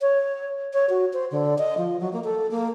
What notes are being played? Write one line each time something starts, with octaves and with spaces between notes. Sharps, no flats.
C#5
C#5
F#4
C5
D3
D#5
F3
F#3
A#3
A4
A#3